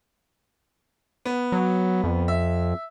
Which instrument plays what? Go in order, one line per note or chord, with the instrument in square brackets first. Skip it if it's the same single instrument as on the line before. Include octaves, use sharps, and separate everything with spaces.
[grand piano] B3
[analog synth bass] F#3
F2
[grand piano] E5